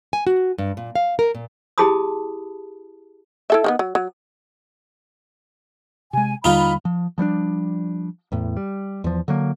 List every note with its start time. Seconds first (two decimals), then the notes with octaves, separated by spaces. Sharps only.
0.13 G#5
0.27 F#4
0.58 G2
0.77 A#2
0.95 F5
1.19 A#4
1.35 A#2
1.78 E4 G4 G#4 A5 B5 D#6
3.50 E4 A4 E5
3.64 D#3 A#3 B3
3.79 F#3
3.95 F#3
6.13 C3 G#3 G#5
6.44 D#2 D3 G3 D#4 F4 B5
6.85 F3
7.18 F3 G3 B3 D4
8.32 E2 A2
8.57 G3
9.04 E2 F3
9.28 D3 F#3 A#3